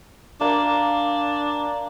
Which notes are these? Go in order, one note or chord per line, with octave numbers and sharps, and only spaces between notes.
A#3 D4